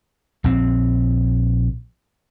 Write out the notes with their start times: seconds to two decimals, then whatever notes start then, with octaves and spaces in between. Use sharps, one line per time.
0.44 A#1 C4